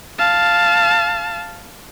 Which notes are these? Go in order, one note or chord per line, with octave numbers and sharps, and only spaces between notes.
F5 A5